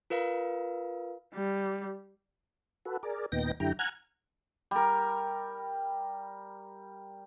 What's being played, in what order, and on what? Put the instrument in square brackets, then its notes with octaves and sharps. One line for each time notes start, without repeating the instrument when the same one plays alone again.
[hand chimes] F4 A#4 B4 F5
[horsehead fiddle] G3
[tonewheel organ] F#4 A4 B4
G#4 A#4 D5
D#2 A#2 B3 D#4 G5 A#6
F#2 D3 E4 G4 G5 A#5
F#5 G#5 A#5 F6 F#6 G#6
[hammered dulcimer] G3 A#4